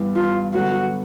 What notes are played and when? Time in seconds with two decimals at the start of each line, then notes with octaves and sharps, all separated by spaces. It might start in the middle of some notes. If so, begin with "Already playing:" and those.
Already playing: G2 E3 G3 B3
0.16 F4
0.54 G2 D3 F#3 B3 F#4